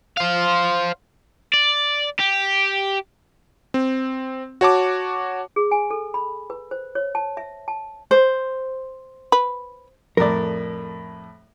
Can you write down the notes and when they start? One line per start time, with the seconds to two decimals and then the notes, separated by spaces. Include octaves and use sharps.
0.17 C5 F5
1.54 D5
2.20 G4
3.74 C4
4.61 F#4 C#5 A5 D6
5.56 G#4
5.71 G#5
5.91 A4
6.14 B5
6.50 B4
6.71 C5
6.95 C#5
7.15 A5
7.37 E5
7.68 A5
8.11 C5
9.32 B4
10.17 F2 A2 A#4 D5